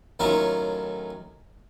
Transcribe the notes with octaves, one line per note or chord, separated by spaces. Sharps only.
A2 D#3 F#3 C#4 F4